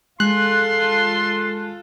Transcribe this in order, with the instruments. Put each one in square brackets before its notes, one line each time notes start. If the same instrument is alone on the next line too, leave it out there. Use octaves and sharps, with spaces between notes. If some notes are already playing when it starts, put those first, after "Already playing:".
[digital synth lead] G#3 [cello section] F4 A4 [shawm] C6 [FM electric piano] F#6